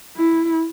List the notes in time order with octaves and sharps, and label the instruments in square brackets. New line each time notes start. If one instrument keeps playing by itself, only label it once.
[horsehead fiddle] E4